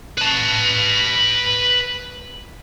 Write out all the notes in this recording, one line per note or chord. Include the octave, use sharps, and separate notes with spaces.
B4 A5